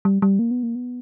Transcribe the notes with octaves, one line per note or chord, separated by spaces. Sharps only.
G3
G3
A#3
B3
A#3
B3